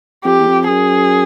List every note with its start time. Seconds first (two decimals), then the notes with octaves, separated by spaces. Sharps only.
0.25 F2 G4
0.40 E2
0.47 F2
0.68 F#2 G#4